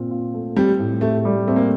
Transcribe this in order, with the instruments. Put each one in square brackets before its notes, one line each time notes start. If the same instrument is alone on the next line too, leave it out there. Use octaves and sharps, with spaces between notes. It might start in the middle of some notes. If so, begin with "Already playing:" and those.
Already playing: [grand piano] A#2 C4 F4
F4
A3
[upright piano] G3 [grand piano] C4
[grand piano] A2
[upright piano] A3 [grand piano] G4
[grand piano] G3
[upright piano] A3 [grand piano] C4
[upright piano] A#3